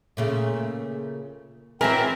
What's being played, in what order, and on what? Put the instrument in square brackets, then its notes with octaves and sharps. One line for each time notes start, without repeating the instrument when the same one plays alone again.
[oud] A#2 C#3 A3
[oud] E3 F#3 G#3 [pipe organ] C4 E5 [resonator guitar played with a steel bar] A#4 [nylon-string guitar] B4 G#5